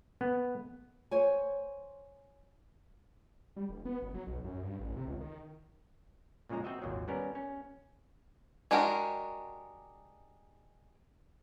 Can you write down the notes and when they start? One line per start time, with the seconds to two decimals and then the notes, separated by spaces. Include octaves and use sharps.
0.21 B3
1.11 C5 C#5 G#5
3.56 G3
3.69 E1
3.85 B3
4.02 F#1
4.14 F#3
4.27 B1
4.44 F#2
4.63 G2
4.80 A1
4.96 C3
5.08 C#2
5.20 D#3
6.49 A#2 C#3 F3 G#3 A#5
6.64 C4 F#4 D#5 E5
6.82 G#1 D#2 A#2 F3 F#3
7.08 G3 B3 C#4 A#4
7.35 C#4
8.71 G#3 D4 F#4 G4 A#4